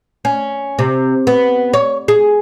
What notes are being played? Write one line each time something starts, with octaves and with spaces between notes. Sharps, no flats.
C#4
C3
B3
C#5
G#4